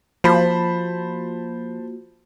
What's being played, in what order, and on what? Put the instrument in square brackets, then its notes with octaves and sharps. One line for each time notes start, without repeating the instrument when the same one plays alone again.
[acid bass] F3 [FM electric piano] A#3 F4 F#4 [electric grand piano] C5 A5 B5